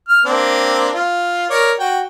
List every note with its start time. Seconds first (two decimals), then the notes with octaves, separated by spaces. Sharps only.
0.09 F6
0.25 A#3 C4 D4
0.93 F4
1.50 A#4 C#5 D5
1.79 F#4 G5